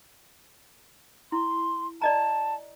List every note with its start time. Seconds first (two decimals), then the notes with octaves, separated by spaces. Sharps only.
1.32 E4 C6
2.02 D5 D#5 A5 A#5